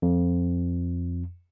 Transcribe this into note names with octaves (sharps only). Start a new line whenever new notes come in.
F2